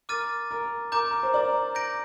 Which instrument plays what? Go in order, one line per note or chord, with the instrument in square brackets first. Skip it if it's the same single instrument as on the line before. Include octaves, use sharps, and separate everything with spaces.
[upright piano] A#4 [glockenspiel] D6 F6 A6 D#7
[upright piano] A#4
[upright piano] A#4 [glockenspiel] A#5 D6 G6
[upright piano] A#4
C5
A#4 D5
[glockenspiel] G6 A#6 D7